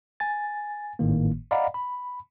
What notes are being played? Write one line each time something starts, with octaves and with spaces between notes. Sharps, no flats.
G#5 A6
G#1 A2 D#3 A#3
D5 D#5 F5 F#5 A#5 B5
B5